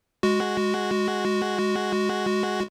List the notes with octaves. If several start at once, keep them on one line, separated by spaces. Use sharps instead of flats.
G#3 F#4